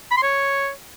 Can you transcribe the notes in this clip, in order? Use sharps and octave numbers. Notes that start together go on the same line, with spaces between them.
B5
C6
C#5